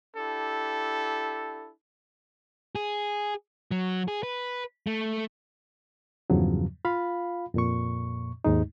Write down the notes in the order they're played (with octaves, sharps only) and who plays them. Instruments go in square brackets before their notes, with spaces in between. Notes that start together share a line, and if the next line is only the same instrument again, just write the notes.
[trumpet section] D4 E4 G4 A4
[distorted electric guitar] G#4
F#3
G#4
B4
A3
[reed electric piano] E2 G2 C#3 F3 F#3
F4 F5 B5
F2 A#2 C#6
D#2 G#2 G#3 D#4